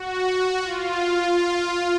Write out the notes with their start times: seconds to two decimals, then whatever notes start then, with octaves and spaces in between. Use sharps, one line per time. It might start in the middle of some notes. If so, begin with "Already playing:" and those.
Already playing: F#4
0.62 F4